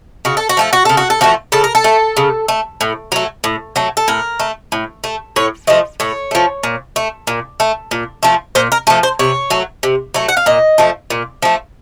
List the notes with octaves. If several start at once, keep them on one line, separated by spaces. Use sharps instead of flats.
C#3 F#4
A4
F#4
F3 A3 A4
F#4
C#3 A4
F#4
A4
F3 A3 F#4
C#3 A4
A#4
A4
A3
C#3
A3
A2
F#3 A3
A2
F#3 A3
A4
A2 A#4
A3
A2
A3
A2 C#5
F3 A3 D#5
A2 C#5
F3 A3
A#2
A3
A#2
A3
A#2
F3 A3
A#2 C5
A#4
F3 A3 A4
C5
C3 C#5
F#3 A3
C3
F#3 A3
F#5
F5
A#2 D#5
F3 A3
A#2
F3 A3